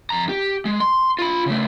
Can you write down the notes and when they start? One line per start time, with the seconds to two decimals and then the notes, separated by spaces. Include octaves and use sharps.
0.10 F2 A#5
0.29 G4
0.65 G#3
0.80 C6
1.19 F4 B5
1.46 C#3 A3